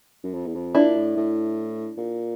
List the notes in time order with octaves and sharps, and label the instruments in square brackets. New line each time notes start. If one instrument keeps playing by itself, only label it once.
[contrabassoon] F#2
F2
E2
F2
[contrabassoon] A#2 [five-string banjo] D4 E4
[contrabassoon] A2
A2
A#2